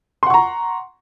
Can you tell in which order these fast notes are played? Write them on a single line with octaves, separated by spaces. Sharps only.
C6 F#5 C#6 A#5